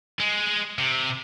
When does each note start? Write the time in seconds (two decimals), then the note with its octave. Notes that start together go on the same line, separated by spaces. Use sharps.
0.20 G#3
0.78 C3